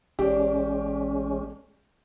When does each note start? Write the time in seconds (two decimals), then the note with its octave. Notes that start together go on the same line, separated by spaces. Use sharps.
0.19 A1 G#3 C#4 D4 G4 A4